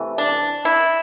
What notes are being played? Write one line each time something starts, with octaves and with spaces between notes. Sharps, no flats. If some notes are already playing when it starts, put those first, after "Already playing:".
Already playing: C3 E3 A3
D4
E4